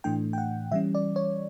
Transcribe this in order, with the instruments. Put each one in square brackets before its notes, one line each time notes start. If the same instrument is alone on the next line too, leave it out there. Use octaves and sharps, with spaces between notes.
[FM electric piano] A2 E3 A3 D4 G5
G5
F#5
E3 G3 C#4 E5
D5
C#5